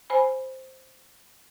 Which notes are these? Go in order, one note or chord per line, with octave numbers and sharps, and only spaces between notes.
C5 G#5 B5